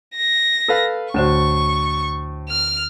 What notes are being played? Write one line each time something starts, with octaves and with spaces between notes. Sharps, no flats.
A#6
A4 B4 F5
D2 A2 D3 F#4 C5 C#6
F6